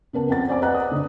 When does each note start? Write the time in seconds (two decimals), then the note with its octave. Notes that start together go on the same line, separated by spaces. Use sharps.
0.13 C#3 B3 A#4 A5
0.28 F2 C4 F#5 A6
0.48 C5 D5 G#5 D6
0.62 B4 D#5 F#5 A#5 F#6
0.74 D#6
0.91 D3 D4